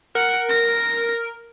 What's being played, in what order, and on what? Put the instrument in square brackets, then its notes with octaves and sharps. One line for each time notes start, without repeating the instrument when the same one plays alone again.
[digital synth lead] A#4 [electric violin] F#5
[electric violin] A#6